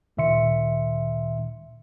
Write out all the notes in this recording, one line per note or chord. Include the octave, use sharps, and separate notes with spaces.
D2 A#2 D#3 E5 C6 C#7